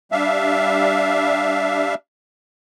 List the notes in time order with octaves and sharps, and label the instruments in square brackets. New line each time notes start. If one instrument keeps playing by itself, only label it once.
[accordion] G3 D4 E5 F5